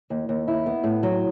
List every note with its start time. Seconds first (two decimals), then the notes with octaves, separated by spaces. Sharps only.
0.10 D#2
0.29 D#2
0.48 E4
0.66 B3
0.84 A2
1.03 F#3